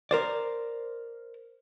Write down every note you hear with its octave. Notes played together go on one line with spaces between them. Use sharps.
A#4 C5 D5